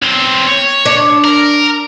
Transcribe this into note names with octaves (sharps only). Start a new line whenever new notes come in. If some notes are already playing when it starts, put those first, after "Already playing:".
B1 C4
C#5
D4
A#4